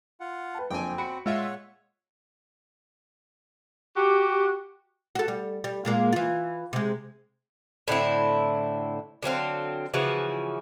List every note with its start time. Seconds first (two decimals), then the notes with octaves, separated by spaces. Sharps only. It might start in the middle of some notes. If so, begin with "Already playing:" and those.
0.20 F4 F#5
0.55 B4 G5 A5
0.70 F#1 F2 D3 C4 G5 G#5
0.98 F#4 B5 C#7 D7
1.26 A#2 G#3 F4 C#5 E5 F#5 E6
3.96 F#4 G4
5.15 F#4 A4
5.28 G3
5.64 G3
5.85 A#2 G#3 A#3
6.12 E3 F4
6.73 C3 G#3
7.88 A2 D3 C4 E4
9.23 D3 F#3 C4 F5
9.94 C#3 E3 F3 F#4